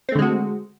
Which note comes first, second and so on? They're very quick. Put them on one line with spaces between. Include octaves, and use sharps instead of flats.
C4 A3 D3 G#3 F#4